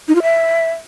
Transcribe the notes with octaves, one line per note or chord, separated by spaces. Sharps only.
D#4
F4
E5